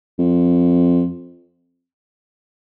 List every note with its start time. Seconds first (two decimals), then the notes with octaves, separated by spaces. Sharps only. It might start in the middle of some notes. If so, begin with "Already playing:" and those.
0.19 F2